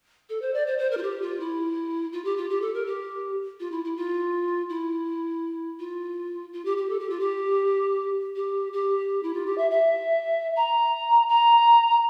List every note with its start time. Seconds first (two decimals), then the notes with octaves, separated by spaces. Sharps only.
0.29 A4
0.41 C5
0.54 D5
0.66 C5
0.78 C5
0.91 A#4
0.97 F4
1.03 G4
1.21 F4
1.40 E4
2.12 F4
2.24 G4
2.37 F4
2.49 G4
2.61 A4
2.74 A#4
2.86 G4
3.60 F4
3.71 E4
3.84 E4
3.96 F4
4.69 E4
5.79 F4
6.53 F4
6.65 G4
6.77 G4
6.89 A4
6.99 G4
7.10 F4
7.20 G4
8.35 G4
8.73 G4
9.23 E4
9.34 F4
9.46 G4
9.57 E5
9.70 E5
10.56 A#5
11.29 A#5